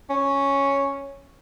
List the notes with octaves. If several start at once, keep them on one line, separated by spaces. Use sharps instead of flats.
C#4